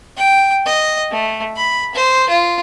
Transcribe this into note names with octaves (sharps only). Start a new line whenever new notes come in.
G5
D#5
A3
B5
C5
F4